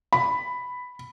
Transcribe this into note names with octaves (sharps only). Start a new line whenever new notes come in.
B5